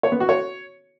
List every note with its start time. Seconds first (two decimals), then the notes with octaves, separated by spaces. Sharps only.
0.03 C#5
0.12 B3
0.20 F#4
0.29 C#5